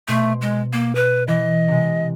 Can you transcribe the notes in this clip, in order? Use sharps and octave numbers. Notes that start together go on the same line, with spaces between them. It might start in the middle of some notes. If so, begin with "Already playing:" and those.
B2 A3 C5 C7
G#3
A#3 D7
B4
E3 D#5
C3 G#3